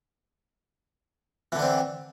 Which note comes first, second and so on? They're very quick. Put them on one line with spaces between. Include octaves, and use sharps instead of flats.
E3 D3 D4 C4